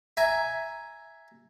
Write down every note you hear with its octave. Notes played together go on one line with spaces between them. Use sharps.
E5 G#5 A#5